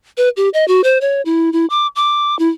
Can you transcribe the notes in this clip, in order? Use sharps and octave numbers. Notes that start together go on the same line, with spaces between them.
B4
G4
D#5
F#4
C5
C#5
E4
E4
D6
D6
E4